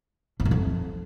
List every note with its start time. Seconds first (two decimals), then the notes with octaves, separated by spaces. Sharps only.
0.40 E3
0.45 F#2
0.51 F2